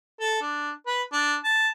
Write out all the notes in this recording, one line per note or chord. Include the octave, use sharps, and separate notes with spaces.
A4
D4
B4
D4
A5